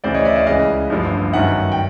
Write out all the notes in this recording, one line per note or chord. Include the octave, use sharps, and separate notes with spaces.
D2 C#3 E3 C5 D5
C#5 D#5
D5 E5
D#5 F5
C#2 C#3 E3 D#5 F5
A1 G2 D3 F3
G1 F#2 D#3 E5 F#5
G5